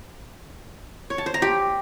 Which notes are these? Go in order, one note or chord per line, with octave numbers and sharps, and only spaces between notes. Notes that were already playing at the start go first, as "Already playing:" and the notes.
C#5
A5
C5
A#5
G4